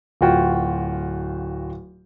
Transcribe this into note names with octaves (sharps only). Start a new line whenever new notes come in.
D1 F4 F#4 G5